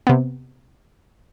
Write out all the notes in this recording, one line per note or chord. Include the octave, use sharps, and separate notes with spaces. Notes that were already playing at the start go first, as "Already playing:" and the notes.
C3 B3